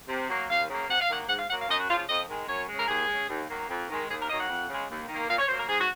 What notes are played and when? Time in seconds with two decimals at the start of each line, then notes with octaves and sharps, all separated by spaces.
0.08 C3
0.29 F#3 A#3
0.49 D#2 F5
0.69 C#3 F#3 A#3
0.88 C3 F#5
1.00 F5
1.09 D#3 F#3 A#3 F#5
1.28 G#2 F#5
1.39 F5
1.49 F#3 A#3 F#5
1.59 F5
1.69 F#2 D#5
1.79 F#4
1.88 C#3 F3 F4
1.99 F4
2.08 F2 D#5
2.28 D#3 G#3
2.48 F#2 C#5
2.69 C#3 G#3
2.78 A#4
2.88 D#2 G#4
3.08 C#3 G#3
3.29 D#2
3.48 D#3 F#3 A#3
3.68 F2
3.89 D#3 G#3
4.08 D#2 G#4
4.19 A#4
4.28 D#3 F#3 A#3 D#5
4.39 F#5
4.48 F2
4.68 C#3 G#3
4.89 D#2
5.08 D#3 A#3
5.28 A#2 F5
5.38 C#5
5.48 F#3 A#3 C5
5.58 A#4
5.68 G#2 G#4
5.77 F#4